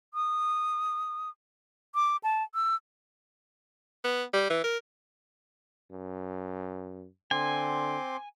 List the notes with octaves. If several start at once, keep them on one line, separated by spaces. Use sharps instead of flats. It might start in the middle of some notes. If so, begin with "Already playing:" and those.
D#6
D6
A5
E6
B3
G3
E3
A#4
F#2
D3 C4 G#5 C6 D6